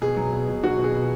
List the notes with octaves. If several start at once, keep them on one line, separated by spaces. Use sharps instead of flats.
B2 G#4
F#3
B2
B2
F#3 F#4
B2
G#4
B2